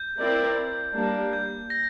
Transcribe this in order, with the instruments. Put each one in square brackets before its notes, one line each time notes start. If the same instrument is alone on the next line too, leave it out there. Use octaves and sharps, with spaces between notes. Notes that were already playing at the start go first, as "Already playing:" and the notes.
Already playing: [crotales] G6
[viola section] C4 E4 A#4 D5
G3 A#3 D4
[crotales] G6
A#6